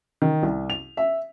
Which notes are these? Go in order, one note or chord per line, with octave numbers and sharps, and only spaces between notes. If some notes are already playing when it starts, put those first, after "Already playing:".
D#3
C2
F7
E5